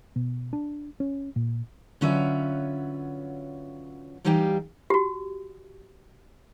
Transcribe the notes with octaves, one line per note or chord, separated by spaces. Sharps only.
B2
D4
C#4
A#2
D3 F#3 C#4 F4 B4 E5
E3 G3 D#4 G4 F5 G5
F#4 G4